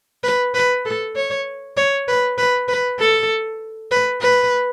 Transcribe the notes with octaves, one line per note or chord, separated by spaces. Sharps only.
B4
B4
A4
C#5
C#5
B4
B4
B4
A4
B4
B4